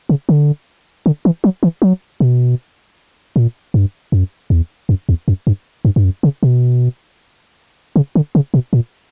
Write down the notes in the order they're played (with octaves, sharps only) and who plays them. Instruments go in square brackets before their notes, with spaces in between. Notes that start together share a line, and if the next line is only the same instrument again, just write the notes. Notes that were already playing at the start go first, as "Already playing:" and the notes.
[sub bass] C#3
D3
D3
E3
F#3
E3
F#3
B2
A#2
G2
F#2
E2
F#2
E2
F#2
G2
G2
G2
F#2
C#3
B2
C#3
D3
C#3
B2
A#2